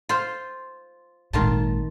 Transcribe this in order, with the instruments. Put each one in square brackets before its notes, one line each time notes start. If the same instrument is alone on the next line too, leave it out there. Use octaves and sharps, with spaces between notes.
[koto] F4 C5
[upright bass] G#1 A#2 [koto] D#3 F4 A5